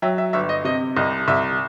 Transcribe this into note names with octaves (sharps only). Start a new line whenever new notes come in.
F#3 E5 G5
E5
G1 E5
D#5
C3 D#5
C2 D#5
C2 E5